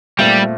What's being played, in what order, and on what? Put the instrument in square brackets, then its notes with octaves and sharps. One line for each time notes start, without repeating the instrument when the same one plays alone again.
[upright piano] A#2 A3 C4 [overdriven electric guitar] G3